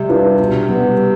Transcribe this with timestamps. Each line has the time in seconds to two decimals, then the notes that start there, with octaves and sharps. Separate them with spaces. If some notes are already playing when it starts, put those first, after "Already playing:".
Already playing: C3 G3
0.09 D4 F4 B4
0.39 B2
0.69 G3 B3